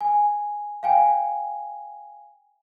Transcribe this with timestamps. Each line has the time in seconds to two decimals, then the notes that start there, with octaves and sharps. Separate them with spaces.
0.01 G#5
0.83 F5 G5 G#5